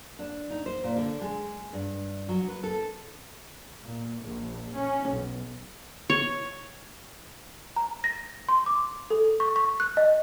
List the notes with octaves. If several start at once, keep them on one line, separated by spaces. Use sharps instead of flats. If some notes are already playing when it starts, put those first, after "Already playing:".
D4
D#4
C5
A#2
D3
G#3
G2
F#3
B4
A4
A#2
A#1
C#4
B1
C#5
A#5
A#6
C6
D6
A4
C#6
C#6
F#6
D#5